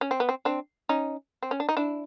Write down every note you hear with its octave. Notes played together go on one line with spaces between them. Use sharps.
C#4
C4
B3
C4
C4 D4
C#4 D#4
C4
C#4
D4
D#4
D4 E4